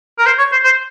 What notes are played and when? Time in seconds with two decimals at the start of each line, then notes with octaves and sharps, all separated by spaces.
0.18 A#4
0.26 C5
0.38 C#5
0.52 C5
0.64 C5